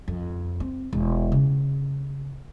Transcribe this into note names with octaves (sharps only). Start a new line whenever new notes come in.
F2
C4
E1
C#3